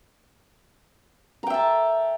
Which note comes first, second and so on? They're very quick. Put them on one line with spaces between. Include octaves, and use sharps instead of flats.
A#5 G5 E5 A5